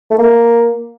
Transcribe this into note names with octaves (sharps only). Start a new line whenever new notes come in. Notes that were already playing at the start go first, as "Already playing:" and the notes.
A3
A#3